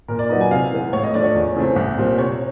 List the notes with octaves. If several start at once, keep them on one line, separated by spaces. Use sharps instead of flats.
A#2 A#4
D5
F#3 B3 D#4 D#5
G#5
C3 F5
E3 G#3 B3
A2 C#5
D#5
F3 A3 D4 D5
C#5
E2
C#3 E3 A3 C4
C2
A#2 G3 C4
C3 C#5